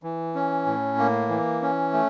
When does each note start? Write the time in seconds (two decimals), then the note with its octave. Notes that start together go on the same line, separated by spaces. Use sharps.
0.03 E3
0.35 C#4
0.66 A2
0.98 A#3
1.29 E3
1.62 C#4
1.93 A3